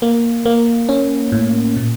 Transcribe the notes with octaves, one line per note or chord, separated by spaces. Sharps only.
A#3
A#3
C#4
A2
A#2